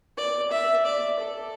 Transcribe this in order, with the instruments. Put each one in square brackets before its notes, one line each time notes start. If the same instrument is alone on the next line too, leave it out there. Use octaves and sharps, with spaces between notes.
[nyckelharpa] D5
E5
D5
A4